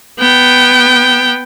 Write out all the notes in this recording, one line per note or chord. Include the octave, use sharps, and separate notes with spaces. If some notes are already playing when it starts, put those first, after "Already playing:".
B3 G5